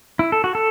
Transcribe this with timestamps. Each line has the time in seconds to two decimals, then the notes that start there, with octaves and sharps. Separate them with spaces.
0.19 E4
0.32 A4
0.44 F#4
0.55 A4